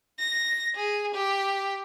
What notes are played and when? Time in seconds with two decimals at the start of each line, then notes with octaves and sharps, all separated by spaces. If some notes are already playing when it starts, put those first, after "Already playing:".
0.19 A#6
0.76 G#4
1.14 G4